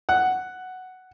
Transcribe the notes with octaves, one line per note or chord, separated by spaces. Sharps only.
F#5